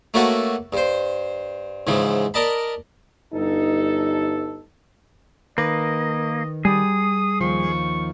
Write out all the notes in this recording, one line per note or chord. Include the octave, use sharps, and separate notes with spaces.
A3 A#3 C#4 F#4 A4 B4
G2 C5
G#2 C#3 E3 F3
A#4 D5 D#5 A5 B5
G1 G2 D#4 A4
D#3 A#3 B4 D#5
G3 G#4 D#6
D#2 D#3 F3 C#6